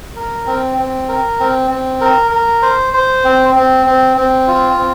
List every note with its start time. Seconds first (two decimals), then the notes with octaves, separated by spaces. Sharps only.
0.16 A#4
0.47 C4
0.78 C4
1.09 A#4
1.40 C4
1.71 C4
2.01 A#4
2.31 A#4
2.62 C5
2.94 C5
3.25 C4
3.55 C4
3.86 C4
4.17 C4
4.47 F4
4.79 C4